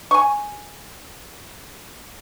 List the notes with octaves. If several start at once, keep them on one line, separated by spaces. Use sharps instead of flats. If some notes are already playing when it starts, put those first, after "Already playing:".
G#5 C#6